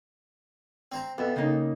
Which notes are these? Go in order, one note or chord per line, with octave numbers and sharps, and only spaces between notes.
C4 C5 A#5
F2 B3 E5
C#3 A#3 D#4